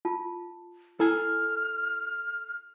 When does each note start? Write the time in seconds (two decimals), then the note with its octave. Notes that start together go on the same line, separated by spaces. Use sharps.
0.05 F4 A5
1.00 E4 A4 G#5 F6